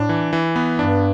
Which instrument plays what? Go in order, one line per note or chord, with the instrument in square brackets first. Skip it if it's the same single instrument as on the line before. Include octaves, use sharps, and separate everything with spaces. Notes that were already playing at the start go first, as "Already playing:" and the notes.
Already playing: [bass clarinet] A2 [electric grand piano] D4
[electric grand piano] E3
E3
B3
[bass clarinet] G2 [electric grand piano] D4